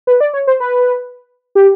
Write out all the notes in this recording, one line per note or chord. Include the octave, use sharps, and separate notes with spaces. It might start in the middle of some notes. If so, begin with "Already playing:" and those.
B4
D5
C#5
C5
B4
G4